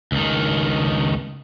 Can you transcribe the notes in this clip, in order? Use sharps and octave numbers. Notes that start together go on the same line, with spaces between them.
C#2 D#3